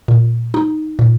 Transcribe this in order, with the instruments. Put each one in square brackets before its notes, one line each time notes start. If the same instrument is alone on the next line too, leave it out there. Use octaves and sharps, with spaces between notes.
[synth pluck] A#2
D#4
A#2